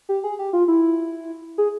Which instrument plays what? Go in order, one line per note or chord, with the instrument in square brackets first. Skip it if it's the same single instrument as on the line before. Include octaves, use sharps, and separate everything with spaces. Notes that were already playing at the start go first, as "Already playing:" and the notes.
[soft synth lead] G4
G#4
G4
F4
E4
G#4